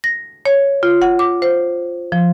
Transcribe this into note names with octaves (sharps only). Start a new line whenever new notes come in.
A#6
C#5
F4
F#5
D6
C5
F3